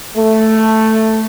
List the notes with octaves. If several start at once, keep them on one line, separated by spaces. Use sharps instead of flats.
A3